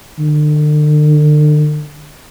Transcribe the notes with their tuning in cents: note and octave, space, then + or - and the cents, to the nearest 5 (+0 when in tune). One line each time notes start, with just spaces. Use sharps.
D3 +40